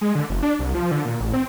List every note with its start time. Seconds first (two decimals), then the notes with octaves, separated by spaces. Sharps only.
0.01 G#3
0.15 D3
0.30 F#1
0.43 D4
0.59 C2
0.74 F3
0.91 D3
1.05 A#2
1.20 A1
1.34 C4